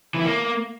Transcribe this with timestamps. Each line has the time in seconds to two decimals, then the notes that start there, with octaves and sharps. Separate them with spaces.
0.14 E3
0.20 E4
0.25 A#3